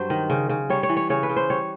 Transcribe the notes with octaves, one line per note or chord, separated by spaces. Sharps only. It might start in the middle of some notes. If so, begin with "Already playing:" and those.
Already playing: G2 F#3 C5
D#3
C#3
C#3
G3 C#5
C#5
E3
C#5
C#3 C#5
B4
C#3
C5
G3 C#5